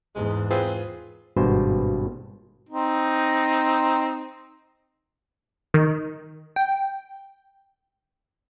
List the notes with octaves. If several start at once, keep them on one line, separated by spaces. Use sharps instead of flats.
E2 G#2 G#3
C4 F4 G#4 B4
G#1 G2 B2 C5
C4 D#4
D#3
G5